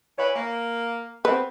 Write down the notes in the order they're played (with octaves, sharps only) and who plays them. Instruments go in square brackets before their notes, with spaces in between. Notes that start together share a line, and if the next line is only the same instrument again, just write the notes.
[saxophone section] E3 B4 C#5
A#3
[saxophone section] B3 C4 [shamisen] B4